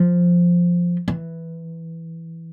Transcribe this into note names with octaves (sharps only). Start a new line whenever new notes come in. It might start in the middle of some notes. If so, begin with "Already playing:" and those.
Already playing: F3
E3